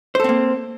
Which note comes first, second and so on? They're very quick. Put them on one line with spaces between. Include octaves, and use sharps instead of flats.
C5 A4 C4 A#3